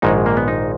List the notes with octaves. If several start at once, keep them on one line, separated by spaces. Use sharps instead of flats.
A#1 G#2 D#3 G#3 D#4
A#3
B3
D#4